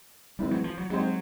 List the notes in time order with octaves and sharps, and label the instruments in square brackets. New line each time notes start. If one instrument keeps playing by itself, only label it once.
[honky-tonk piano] A2 E3 G#3 C4 [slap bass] G3
[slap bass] F#3
F3
F#3
[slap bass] F#3 [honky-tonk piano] G#3 C4 D#4 G4 C5